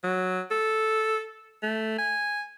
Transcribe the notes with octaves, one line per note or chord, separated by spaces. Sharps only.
F#3
A4
A3
G#5